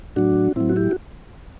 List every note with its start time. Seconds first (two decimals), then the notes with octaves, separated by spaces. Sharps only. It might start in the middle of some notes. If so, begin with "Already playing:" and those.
0.16 A2 F#3 D4 F#4
0.56 A2 F#3 C4 E4
0.69 F#4
0.76 E4 G4
0.91 F#4